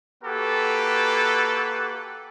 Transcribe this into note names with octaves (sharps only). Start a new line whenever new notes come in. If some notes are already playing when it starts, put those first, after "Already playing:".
A#3 F#4 G4 A4 B4